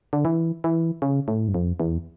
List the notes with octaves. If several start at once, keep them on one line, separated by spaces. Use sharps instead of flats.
D3
E3
E3
C#3
A2
G2
F2
E2